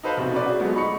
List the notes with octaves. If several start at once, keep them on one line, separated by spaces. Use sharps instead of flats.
D#4 A4 B4 C5 F5
C2 B2 C4
C#4 B4 D5
F#4 G#4
F3 F#3 G#3 A3 B3
D#4 B5 C#6 C#7